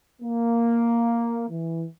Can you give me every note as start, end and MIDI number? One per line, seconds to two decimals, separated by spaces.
0.22 1.49 58
1.49 1.85 52